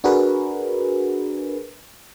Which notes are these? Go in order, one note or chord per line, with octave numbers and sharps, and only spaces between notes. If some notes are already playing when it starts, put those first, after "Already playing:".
D4 F#4 G#4 A#4 B4